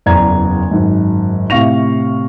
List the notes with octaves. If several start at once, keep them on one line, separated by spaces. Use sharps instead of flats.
F#1 E2 D5 A#5 G#6
G#1 F#2
A2 C3 F5 C#6 A#6 F7